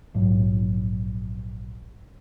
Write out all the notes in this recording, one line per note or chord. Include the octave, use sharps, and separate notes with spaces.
A#1 G#2 F#3